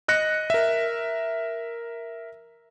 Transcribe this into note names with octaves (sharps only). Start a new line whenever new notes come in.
D#5 F#6 A#6 C#7
A#4 E5